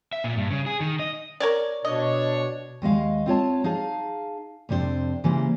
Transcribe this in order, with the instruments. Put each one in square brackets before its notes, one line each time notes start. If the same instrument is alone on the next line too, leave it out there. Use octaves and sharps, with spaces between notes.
[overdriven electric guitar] E5
A#2
G2
C#3
G#4
D#3
D#5
[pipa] A#4 C#5 D5
[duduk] B2 [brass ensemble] D4 C#5 [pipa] D#5
[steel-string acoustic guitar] D#2 G#3 D#5 F5
C4 F4 C#5 A5
D#4 G#4 F5 A5
F2 C3 D4 F4 C5
C#3 E3 G3 A#3 C5